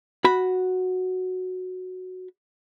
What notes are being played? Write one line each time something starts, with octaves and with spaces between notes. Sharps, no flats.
F#4 B5